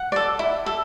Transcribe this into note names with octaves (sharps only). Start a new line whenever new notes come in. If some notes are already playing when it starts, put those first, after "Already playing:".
Already playing: F#5
A4 D5
E4
A4